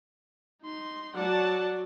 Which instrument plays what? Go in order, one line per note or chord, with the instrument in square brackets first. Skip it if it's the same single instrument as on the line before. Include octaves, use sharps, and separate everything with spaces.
[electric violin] D#4 C6
[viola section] F#3 D5 [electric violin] F#5 A5